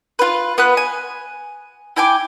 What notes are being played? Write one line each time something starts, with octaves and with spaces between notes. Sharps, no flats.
F4 B4
B3 B4 F#6
G#5
E4 G5 G#5 D6